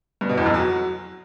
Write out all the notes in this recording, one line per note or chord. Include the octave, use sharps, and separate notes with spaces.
G2
B2
E2
F2
F#3